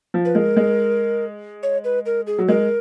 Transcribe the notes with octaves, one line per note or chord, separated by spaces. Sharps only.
F3
B4
G#3 A#4
G#3
C#5
B4
A#4
G#4
F#3
G#3 A#4